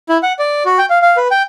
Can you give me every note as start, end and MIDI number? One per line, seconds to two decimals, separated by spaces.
0.09 0.18 64
0.23 0.33 78
0.39 0.63 74
0.66 0.78 66
0.78 0.85 79
0.90 0.98 77
1.02 1.17 77
1.17 1.28 71
1.31 1.42 79